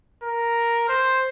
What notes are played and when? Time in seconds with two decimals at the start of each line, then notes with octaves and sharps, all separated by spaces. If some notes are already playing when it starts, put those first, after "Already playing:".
0.24 A#4
0.89 C5